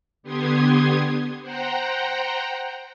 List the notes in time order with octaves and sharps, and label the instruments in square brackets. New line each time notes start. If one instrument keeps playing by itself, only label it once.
[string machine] D3 B3 G4 C6 D#6 G#6
C5 F#5 G5 A#5